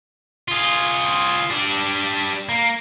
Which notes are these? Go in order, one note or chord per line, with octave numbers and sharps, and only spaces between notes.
F4 G#4
G3 D4
A#3